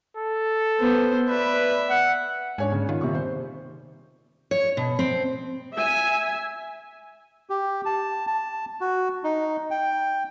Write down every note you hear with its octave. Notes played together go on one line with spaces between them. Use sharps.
A4
B3 C5
B4 D5 E5
F#5
G#2 D4 C#5 G#5
C#3
D#3 F4
C3 G3 C#6
C5
C#5
B2
C4
E5 G#5
G4
A5
A5
F#4
D#4
G5